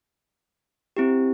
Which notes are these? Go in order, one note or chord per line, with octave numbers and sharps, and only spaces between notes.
C4 E4 G4